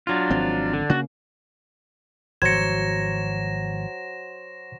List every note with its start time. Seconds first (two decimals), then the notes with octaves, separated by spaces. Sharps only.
0.07 F#3 D4 F4
0.30 G#1 F3 C4
0.73 D3
0.90 C#3 A#3 F#4
2.42 G#1 F3 F#3 C5 G#6 A#6 C#7 E7